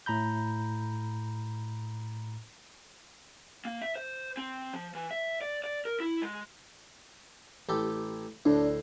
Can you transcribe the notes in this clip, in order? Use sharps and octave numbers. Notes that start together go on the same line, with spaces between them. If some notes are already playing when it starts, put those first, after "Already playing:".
A2 A#5 B5 G6
A#3
E5
C5
C4
F3
E3
E5
D5
D5
A#4
E4
G#3
A1 G4 A4
D2 A2 D4